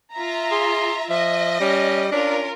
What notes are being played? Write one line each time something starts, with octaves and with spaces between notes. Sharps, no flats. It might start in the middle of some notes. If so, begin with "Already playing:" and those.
F4 E5 A#5
G#4 C6
F3 D#5 E5 A#6
G3 C#4
C#4 D4 F4 A#4